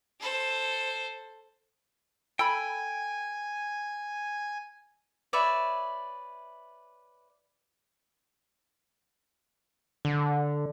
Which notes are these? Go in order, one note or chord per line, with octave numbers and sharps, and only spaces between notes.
A4 C5
A4 G5 G#5 B5
B4 C#5 D5 E5
D3